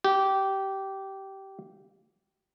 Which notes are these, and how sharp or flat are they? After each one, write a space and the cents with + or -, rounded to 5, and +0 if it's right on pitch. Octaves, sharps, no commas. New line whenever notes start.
G4 -15